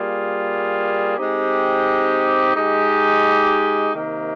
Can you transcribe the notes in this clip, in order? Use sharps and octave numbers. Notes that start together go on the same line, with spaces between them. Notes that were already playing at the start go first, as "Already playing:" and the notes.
Already playing: G3 A#3 F4 G#4
G#3 C4 D#4 G4
G#3 D#4 G4
C3 D#3 A#3